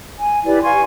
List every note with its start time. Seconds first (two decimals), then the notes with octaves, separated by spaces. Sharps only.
0.18 G#5
0.45 E4 G4 B4 D5
0.62 F5 G#5 C6 C#6